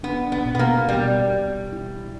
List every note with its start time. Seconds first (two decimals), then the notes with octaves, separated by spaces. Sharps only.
0.03 B3 D4
0.32 B3
0.46 B2
0.55 B3
0.59 A#3
0.88 B2 G3
1.30 B2
1.72 E4